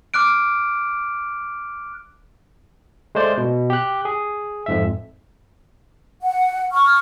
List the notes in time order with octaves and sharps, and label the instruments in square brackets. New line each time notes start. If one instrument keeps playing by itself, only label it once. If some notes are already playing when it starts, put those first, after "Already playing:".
[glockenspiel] D6 F6 F#6 D7
[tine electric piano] G#3 A3 C5 D5
B2
G4 F#6
G#4
F2 G#2 E5
[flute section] F#5
C#6 F6